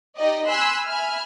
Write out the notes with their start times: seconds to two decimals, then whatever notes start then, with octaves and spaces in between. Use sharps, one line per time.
0.17 D#4 G4 D5 D#5
0.48 G#5 B5 C6 E6 F#6
0.87 E5 G#5 B5 F6